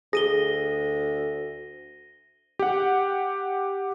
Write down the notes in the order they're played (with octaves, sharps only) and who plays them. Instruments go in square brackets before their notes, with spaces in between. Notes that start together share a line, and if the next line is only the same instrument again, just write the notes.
[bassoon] D2 [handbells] G#4 [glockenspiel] A#6 D#7 G7
[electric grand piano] G4 F#5